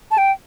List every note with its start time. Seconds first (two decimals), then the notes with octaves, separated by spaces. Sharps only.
0.11 A5
0.18 G5